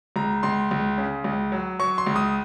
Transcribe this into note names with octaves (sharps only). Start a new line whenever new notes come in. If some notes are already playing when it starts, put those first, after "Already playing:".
C#2 A#5
C#2 C6
C#2
C#3
C#2
F#3
F#3 C#6
C6
C#2
D#6